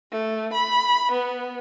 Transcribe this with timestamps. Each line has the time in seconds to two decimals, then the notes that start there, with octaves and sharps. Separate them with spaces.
0.12 A3
0.54 B5
1.12 B3